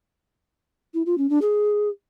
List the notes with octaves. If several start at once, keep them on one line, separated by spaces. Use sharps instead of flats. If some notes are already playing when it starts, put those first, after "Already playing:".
E4
F4
C#4
D4
G#4